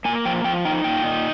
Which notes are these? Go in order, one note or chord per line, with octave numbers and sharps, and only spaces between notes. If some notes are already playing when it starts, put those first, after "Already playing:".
A#3 G#5
F3 G5
F3 G5
D#4 G5
A#2 G5
D#4